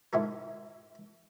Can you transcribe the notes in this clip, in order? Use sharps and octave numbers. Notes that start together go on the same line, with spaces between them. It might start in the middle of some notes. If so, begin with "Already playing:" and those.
G#2 D3 E4 A4 A#4